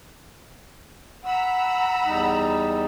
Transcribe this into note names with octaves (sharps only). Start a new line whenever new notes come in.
F#5 A#5 B5 E6
E2 G3 D#4